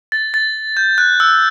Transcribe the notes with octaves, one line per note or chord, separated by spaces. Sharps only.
A6
A6
G6
F#6
E6